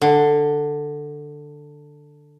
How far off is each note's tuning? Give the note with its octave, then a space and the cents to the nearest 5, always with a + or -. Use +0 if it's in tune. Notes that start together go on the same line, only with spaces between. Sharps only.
D3 +10